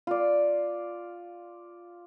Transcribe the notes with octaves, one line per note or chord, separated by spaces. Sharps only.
F4 D5